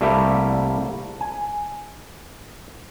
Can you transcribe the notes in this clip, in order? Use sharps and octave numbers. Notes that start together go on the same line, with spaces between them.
C2 G3 A3 A#3 E4 G4
G#5